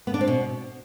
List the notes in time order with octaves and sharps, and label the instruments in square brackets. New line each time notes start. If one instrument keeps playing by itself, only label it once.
[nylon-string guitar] B3
D4
C4
B2